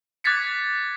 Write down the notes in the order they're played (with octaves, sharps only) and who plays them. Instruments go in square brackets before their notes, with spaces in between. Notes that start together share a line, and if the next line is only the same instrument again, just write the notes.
[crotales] D6 F#6 G#6 A6 B6 C#7